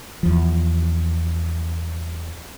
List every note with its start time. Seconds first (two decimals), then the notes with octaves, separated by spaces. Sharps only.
0.23 E2 F3